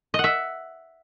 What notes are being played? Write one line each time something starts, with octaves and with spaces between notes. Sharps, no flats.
D#5
F#5
E5